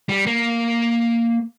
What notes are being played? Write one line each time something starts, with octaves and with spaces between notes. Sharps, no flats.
G3
A#3